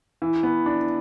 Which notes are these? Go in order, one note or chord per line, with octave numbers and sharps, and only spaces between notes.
E3
B3
D4